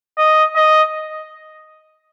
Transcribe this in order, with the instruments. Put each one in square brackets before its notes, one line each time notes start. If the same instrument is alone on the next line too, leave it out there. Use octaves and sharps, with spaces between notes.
[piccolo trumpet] D#5
D#5